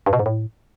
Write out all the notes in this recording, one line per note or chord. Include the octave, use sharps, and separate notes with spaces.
G2
B2
G#2
A2